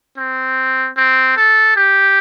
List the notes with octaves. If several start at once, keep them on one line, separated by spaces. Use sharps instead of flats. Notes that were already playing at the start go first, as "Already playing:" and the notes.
C4
C4
A4
G4